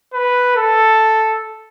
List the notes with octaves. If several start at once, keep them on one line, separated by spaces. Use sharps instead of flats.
B4
A4